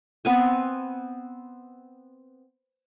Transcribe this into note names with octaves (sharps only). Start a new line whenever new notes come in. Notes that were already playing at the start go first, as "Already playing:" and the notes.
B3 C4 G#5